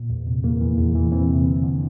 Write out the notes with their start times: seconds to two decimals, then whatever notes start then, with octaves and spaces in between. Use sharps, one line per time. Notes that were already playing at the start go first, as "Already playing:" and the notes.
Already playing: A#2
0.10 E2
0.27 C3
0.44 E2 A#3
0.61 E3
0.78 E2
0.95 E3
1.12 E3 C4
1.29 C3
1.46 D3
1.63 D3